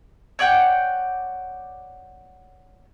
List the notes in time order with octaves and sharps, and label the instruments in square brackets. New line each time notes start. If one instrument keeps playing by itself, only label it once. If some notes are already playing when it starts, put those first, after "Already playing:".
[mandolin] C#5 D5 F#5 G5